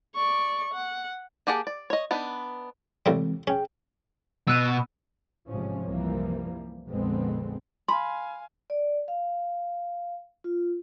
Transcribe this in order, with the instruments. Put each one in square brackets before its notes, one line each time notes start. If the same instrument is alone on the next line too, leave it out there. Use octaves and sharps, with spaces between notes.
[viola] D5 C#6
F#5
[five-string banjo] A#3 G4 G#4 F#5 A5
D5
C#5 D#5
B3 D4 D#4 B4
[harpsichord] C2 A2 G3 [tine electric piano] E3 G#3 C4
[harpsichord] C#4 [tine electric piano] G#4 G5
[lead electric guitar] B2 [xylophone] E6 F#6 D#7
[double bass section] A1 G#2 C3 F3 C#4
C2 F#2 E3 F3 G3 A#3
A#1 F2 D3 G#3 B3 C4
[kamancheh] F5 G#5 [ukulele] B5 [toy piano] C6
[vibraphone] D5
F5
F4